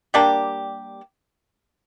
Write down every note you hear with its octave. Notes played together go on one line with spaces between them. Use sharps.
G3 A#3 D4 G4